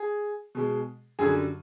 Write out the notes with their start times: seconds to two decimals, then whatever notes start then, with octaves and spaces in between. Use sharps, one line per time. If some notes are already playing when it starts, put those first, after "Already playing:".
Already playing: G#4
0.55 B2 G#3
1.19 F#2 D3 G3 G#4